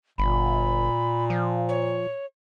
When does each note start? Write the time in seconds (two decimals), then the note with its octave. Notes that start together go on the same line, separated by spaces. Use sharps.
0.18 G1 A#2 B5
1.30 F3
1.69 C#5